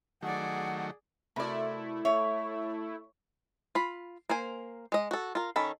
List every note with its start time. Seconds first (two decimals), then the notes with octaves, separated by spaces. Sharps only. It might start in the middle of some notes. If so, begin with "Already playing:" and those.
0.23 D#3 F#3 A3 G#4 D5 F#5
1.36 C3 A3 E4 F#4 A#4 D5 B5
2.05 C#5 E5
3.75 F4 B5
4.29 A#3 A#4 C5 G#5
4.92 G#3 D#5
5.11 F#4 A4
5.35 F4 A#4
5.56 D#3 C#4 A4 B5